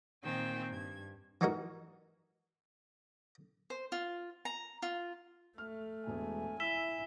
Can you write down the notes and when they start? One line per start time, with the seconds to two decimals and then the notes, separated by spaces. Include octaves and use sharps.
0.23 A#2 D#3 C4 G5 G#5 E6
0.70 G2 G#6
1.41 E3 D#4 F#4 A#4
3.70 C5
3.92 F4
4.45 A#5
4.82 F4
5.58 A3 F6
6.07 E1 G#3 G#5
6.60 E4 E6 B6 E7 G7